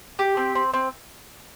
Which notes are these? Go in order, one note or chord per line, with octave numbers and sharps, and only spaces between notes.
G4
C4
C4
C4